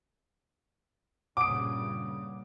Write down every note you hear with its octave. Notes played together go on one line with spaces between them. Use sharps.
G2 A#2 C#3 F#5 D6 D#6 D7